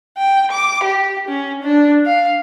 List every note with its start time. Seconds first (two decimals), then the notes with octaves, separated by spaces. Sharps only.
0.18 G5
0.51 D6
0.83 G4
1.29 C#4
1.63 D4
2.06 F5